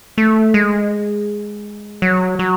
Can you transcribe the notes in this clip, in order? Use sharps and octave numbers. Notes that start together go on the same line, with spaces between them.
A3
G#3
F#3
F#3